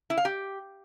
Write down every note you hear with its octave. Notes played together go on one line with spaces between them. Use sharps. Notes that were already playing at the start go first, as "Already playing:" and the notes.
E4
F5
G4